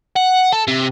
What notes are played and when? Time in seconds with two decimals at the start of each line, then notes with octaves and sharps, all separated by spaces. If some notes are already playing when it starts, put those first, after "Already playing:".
0.16 F#5
0.52 A4
0.68 C3